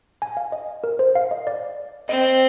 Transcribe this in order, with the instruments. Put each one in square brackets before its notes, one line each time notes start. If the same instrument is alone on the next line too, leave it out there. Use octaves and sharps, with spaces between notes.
[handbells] G#5
F5
D#5
A#4
C5
F5
D#5
D5
[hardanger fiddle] C4 [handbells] D#5